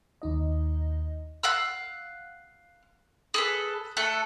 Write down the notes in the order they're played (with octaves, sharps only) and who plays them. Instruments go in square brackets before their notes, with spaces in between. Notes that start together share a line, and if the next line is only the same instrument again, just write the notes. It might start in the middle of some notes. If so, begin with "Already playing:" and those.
[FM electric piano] D#2 D#4 D#5
[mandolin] F5 F#5 E6
G#4 A4 B4
A3 A4 F#6